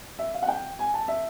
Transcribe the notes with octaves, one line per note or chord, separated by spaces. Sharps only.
E5
F5
F#5
G5
G#5
A5
E5